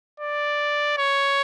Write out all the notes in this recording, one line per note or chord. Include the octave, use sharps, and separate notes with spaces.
D5
C#5